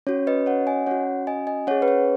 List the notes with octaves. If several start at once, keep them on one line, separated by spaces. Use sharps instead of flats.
C#4 F#4 C#5
B4 D#5
C#5 F#5
D#5 G#5
C#4 F#4 C#5 F#5
D#5 G#5
D#5 G#5
C#4 G#4 C#5 F#5
B4
C#5